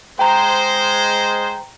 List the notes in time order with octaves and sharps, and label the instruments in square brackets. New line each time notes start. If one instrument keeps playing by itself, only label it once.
[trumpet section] G#3 C5 [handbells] G5 A#5